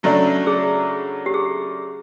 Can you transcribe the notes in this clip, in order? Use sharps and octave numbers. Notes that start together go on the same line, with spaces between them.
C#3 F#3 A3 D4
G#4
G4
G#4